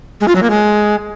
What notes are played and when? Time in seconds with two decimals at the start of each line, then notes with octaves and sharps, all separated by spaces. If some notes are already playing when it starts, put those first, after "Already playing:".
0.21 G#3
0.28 F4
0.35 F#3
0.43 A#3
0.50 G#3